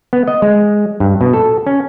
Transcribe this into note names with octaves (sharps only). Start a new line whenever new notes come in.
B3
D#5
G#3
G2
B2
A4
C#4